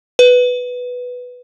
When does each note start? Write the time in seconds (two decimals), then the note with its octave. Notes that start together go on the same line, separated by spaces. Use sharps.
0.19 B4